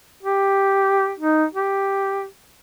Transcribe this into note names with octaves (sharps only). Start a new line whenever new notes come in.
G4
D#4
G4